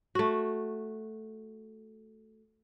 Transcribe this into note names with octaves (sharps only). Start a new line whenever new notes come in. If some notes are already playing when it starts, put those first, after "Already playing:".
A3 F#4